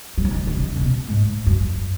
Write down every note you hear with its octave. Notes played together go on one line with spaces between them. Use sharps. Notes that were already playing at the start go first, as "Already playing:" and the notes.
F#3
F3
D#3
D#3
C#3
A#2
B2
G#2
F#2